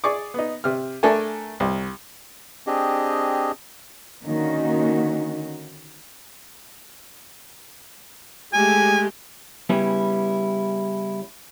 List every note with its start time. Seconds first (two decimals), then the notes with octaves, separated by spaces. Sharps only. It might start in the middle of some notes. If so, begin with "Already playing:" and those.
0.04 G#4 D5 C#6 D6
0.34 B3 D#4
0.64 C3 F6
1.03 A3 D4 A4 A#4 G#5
1.60 C2
2.67 C4 D4 G4 G#4 D#5
4.23 D3 D#3 A#3 C#4 D#4 F#4
8.53 G#3 A3 G4 G#5
9.69 C#3 G3 B3 C#4 E4